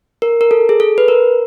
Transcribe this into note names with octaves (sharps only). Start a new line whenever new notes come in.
A#4
A#4
A4
G#4
A4
B4
A#4